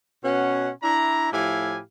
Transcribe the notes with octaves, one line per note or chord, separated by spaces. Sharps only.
B2 C#4 F#5
D4 E4 A#5
A2 F3 E4 G4 F5 G#5